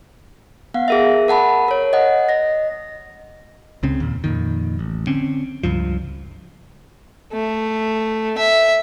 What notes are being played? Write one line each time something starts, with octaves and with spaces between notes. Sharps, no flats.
B3 F5 F#5
G#4 A#4 E5
A#4 F#5 A5 B5
A#4 C#5
D#5 F#5
D#5 A#6
C#2 C#3 C4
D#2 A#2
F2 A#2 D#3
A1
D3 C4 C#4
C#2 G2 F3
A3
E5